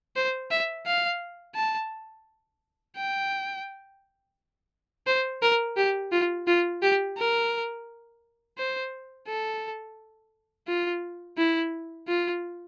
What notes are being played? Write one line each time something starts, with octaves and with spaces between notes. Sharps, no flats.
C5
E5
F5
A5
G5
C5
A#4
G4
F4
F4
G4
A#4
C5
A4
F4
E4
F4